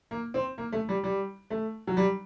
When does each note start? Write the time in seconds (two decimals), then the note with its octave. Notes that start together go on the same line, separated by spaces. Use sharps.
0.11 A#3
0.34 C4
0.58 A#3
0.72 A3
0.89 G3
1.04 G3
1.50 A3
1.87 F#3
1.97 G3